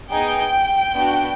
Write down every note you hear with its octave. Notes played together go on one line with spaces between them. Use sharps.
B3 D#4 G#4 G5
B3 D4 F#4